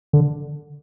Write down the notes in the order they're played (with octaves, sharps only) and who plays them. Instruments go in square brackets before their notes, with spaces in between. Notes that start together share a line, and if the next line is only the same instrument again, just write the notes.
[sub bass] D3